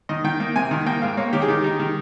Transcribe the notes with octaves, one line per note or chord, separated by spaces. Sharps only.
D#3 D#5
D#3 G5
A#3
C3 G#5
D#3
A#3 G5
G#2 F5
A#3 C#5
D#3 G4
G#4
D#3 G4
D#4
D#3